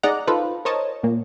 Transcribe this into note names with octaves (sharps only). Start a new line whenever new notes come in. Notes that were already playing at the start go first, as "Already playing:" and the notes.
D#4 G#4 D5 D#5 F#5 A#5
D#4 F4 A4 B4 C5
A#4 C5 C#5 D#5 A5
A#2 A#3